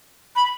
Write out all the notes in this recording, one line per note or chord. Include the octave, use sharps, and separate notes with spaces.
B5